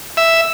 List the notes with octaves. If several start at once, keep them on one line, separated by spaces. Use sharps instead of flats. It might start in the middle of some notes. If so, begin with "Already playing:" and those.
E5